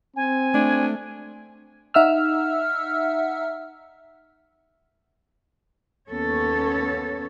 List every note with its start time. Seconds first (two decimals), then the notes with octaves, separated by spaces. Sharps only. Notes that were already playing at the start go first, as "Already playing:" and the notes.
0.16 C4 G#5
0.54 A3 D4
1.94 D#4 E5 F#5 E6 F6
6.09 D#2 A#3 B3 C#4 A4 C#5